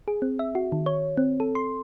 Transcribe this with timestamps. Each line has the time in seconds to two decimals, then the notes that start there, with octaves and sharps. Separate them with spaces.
0.08 G#4
0.22 C4
0.39 E5
0.55 F#4
0.72 D#3
0.86 C#5
1.17 C4
1.40 A4
1.55 C6